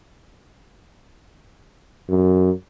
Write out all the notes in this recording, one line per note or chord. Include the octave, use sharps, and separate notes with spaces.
F#2